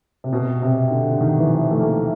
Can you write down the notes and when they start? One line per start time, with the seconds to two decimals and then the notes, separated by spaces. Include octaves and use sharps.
0.24 C3
0.33 B2
0.62 C3
0.91 D3
1.10 D3
1.21 D#3
1.39 E3
1.50 F3
1.71 A3
1.80 A#3